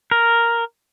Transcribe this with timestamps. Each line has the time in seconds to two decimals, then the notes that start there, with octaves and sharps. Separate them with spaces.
0.11 A#4